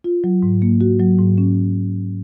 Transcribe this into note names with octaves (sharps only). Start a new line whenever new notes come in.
F4
F#3
G#2
A#3
F#4
F#3
G#2
C#4